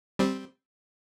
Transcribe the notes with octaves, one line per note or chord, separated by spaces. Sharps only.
G3 C4